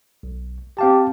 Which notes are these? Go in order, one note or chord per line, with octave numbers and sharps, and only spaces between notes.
B1
C4 G4 F5 A5